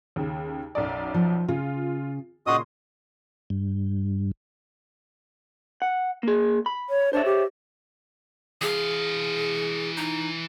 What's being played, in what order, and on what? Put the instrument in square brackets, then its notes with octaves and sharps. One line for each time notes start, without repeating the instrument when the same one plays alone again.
[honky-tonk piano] D#2 C#3
B1 F#2 D5
[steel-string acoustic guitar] F3
[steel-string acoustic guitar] C#3 [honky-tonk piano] F4
[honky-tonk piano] A#2 C#3 C6 [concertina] F#4 D#5 D#6
[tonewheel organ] G2
[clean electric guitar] F#5
A#3 G#4
B5
[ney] C#5
[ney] D4 [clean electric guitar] C5 C#5 E5
[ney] G4
[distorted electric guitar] E3 F5 [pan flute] G#4
[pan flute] D#4